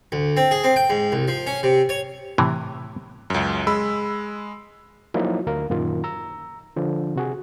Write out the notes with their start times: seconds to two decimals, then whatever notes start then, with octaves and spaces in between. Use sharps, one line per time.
0.12 D2
0.37 C4
0.51 G#4
0.64 C4
0.76 G5
0.90 G#2
1.12 C2
1.28 F3
1.47 C#4
1.63 C3
1.89 C#5
2.38 A2 C3 E3
3.30 C#2 F#2
3.67 G#3 B5 E6
5.14 F3 F#3 A#3 D#4 E4
5.47 D2 A#4 F5
5.70 F#2 A#2 D#3 F4
6.04 A#5 E6
6.76 D3 F3
7.16 C3 F#4 G#4